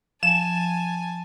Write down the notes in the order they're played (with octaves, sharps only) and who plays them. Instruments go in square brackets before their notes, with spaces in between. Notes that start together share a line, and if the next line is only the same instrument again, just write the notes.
[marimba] F3 [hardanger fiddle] G#5 A5 [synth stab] E7